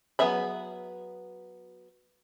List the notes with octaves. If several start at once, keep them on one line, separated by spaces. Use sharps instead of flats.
F#3 B3 G#4 E5 B5